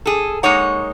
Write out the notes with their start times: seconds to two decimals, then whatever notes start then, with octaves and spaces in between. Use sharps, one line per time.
0.06 G#4 A4
0.43 G#3 A#3 D#4 C#5 F#5